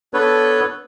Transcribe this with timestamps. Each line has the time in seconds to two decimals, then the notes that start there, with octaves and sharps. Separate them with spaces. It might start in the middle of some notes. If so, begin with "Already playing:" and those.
0.14 B3 D4 A4 B4 C#5